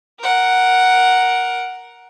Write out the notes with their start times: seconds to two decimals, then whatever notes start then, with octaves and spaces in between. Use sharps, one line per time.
0.20 A#4 F#5